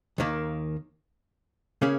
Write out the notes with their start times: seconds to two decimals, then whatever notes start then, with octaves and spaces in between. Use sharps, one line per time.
0.18 D#2 D#3 A#3
1.82 C#3 A#3 C#4 G#4